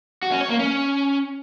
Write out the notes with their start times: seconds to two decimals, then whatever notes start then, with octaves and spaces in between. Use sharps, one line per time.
0.23 F#4
0.32 C#4
0.41 C#5
0.50 A#3
0.59 C#4